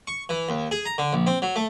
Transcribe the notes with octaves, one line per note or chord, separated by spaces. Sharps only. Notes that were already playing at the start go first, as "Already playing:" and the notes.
C#6
E3
D#2
G#4
A#5
D3
A#1
C4
F#3
A3